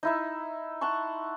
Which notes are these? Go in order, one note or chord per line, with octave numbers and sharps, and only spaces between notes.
D#4 E4 E5
F#5 A5 C6 C#6